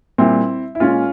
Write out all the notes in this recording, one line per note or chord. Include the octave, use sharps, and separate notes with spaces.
A#2 G3 C4 E4
E4
A#2 G#3 C#4 F4